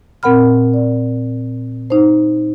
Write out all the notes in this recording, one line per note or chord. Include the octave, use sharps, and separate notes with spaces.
A#2 C4 A#4 F#5 B5 F6
D5
D#4 C5